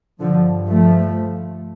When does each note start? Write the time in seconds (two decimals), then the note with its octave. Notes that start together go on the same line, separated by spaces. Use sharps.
0.19 G2 D3 F3
0.69 F3 A3